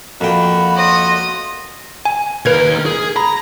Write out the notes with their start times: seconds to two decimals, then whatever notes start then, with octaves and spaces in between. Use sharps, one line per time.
0.21 F2 A#3 F#4 G5 B5
0.76 D#5 C6
2.05 G#5
2.46 D#2 A#4 B4 G#6
2.86 G#4
3.16 A#5 B5